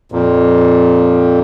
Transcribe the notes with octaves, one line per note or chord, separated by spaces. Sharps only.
F2 A#2